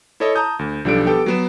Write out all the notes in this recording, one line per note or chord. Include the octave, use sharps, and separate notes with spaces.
E4 A4 C#5 D#5
A5 A#5 D#6 G6
D2
B1 F3 G3 D4 A4 D7
B3 G4 A4 G5
F#3 B3 E7